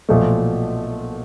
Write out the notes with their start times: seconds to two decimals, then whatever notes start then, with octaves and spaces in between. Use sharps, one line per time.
0.09 B1 A#2 F3 A3